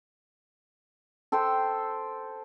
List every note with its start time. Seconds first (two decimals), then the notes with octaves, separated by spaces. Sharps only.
1.32 A4 C5 G5 C6